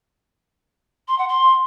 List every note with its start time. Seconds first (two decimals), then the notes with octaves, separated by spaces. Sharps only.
1.08 C6
1.18 F#5
1.28 C6